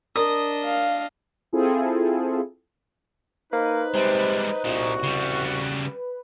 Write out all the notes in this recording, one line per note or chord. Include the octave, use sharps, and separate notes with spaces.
D4 A#4 D#5 D#6
F5
C4 E4 F4 G#4 A4
A#3 D#4 B4 C5
C3 G3 G#3
C2 A#2 F3 F#4
C#3 G3
B4